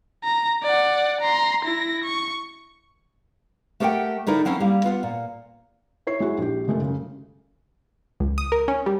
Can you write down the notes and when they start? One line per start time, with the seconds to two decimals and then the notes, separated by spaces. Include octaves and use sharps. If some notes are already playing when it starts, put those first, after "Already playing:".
0.24 A#5
0.62 D5 F#5
1.21 A#5 C6
1.64 E4 A#6
2.04 C#6
3.80 A3 G4 A#4 C5 F#5 G5
4.27 D3 D#4 E4 A#4 D5
4.45 F#3 C4 C#4 E4
4.60 G3 A#3
4.84 B3 F4 F#5
5.03 A#2
6.07 E4 C#5 C7
6.20 G#3 E4 F#4 G#4
6.38 A#1 G4
6.68 F#1 G#3 A3 A#4
6.82 F#2 C#3
8.20 C#2
8.38 D#6
8.52 A#4
8.68 C#4
8.86 G3